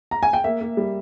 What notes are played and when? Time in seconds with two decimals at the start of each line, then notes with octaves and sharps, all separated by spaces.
0.11 A#5
0.23 G#5
0.33 G5
0.44 A#3 E5
0.61 A#3
0.77 G3